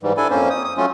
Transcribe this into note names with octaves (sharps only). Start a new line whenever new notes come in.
G#2 E3 G3
D4 E4 A4 G#5
F2 A#3 C#4 C5
D#6
D#6
F#3 A3 C#4 F4